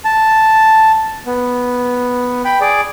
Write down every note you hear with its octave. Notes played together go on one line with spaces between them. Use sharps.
A5
B3
G5 B5
G#4 D5